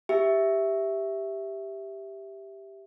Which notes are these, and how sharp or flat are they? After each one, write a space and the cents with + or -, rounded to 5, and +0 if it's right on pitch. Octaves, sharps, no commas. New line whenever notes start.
G4 +0 E5 +0